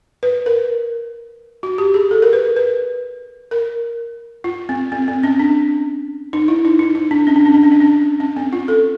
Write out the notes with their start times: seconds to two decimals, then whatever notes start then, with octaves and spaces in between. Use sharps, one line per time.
0.23 B4
0.46 A#4
1.63 F#4
1.78 G4
1.94 G#4
2.11 A4
2.22 A#4
2.33 B4
2.56 B4
3.51 A#4
4.44 F4
4.69 C4
4.92 C4
5.08 C4
5.23 C#4
5.39 D4
6.33 D#4
6.48 E4
6.65 D#4
6.79 D#4
6.95 D#4
7.11 D4
7.27 C#4
7.36 D4
7.45 C#4
7.54 D4
7.63 C#4
7.72 D4
7.80 C#4
8.20 C#4
8.36 C4
8.53 F4
8.68 A4